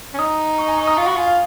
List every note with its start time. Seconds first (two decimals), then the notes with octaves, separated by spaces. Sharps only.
0.14 C#4
0.19 D#4 D#6
0.58 C#6
0.68 G#5
0.78 C#6
0.87 D#6
0.97 F4 C#6
1.07 F#4 B5
1.16 F4 G#5
1.26 F5